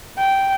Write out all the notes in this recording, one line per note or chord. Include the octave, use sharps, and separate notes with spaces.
G5